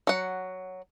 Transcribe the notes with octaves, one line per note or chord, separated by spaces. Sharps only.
F#3 F#5